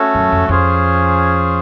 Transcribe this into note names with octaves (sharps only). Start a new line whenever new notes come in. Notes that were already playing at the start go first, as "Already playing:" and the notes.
Already playing: A3 C#4 F#4 A4
F#2
F2
F2 C#4 F4 G#4 C5